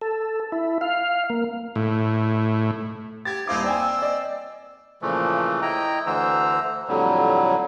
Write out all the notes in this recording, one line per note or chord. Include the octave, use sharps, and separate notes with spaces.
A4
E4
F5
A#3
A2
G4 G#6 A6
D#1 C4 D#4 E4 F5 D6
C4 D5 G5 G#5 E6
D5 D#5
A#2 C#3 E3 F3 A3
E4 D#5 G5 A#5
D2 D3 E3 C5 A#5 E6
F2 A2 D3 F#3 G3